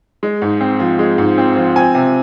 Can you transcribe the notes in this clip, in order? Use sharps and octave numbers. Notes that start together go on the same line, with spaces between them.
G#3
G#2
C4
F3
G#3
G#2
C4
F3
C4 G#5
C3